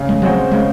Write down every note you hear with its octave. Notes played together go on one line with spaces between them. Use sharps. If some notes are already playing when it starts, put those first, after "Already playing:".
Already playing: C#3
G#3
F#3 G#3 C4 F#4 C5
C#3 G#3